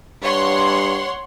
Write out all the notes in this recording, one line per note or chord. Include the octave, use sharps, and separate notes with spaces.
G2 C#5 F#5 C6